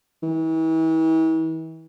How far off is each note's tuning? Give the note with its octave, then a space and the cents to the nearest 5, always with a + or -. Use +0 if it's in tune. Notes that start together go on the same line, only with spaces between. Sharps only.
E3 -40